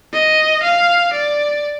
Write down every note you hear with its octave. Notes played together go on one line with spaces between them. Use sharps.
D#5
F5
D5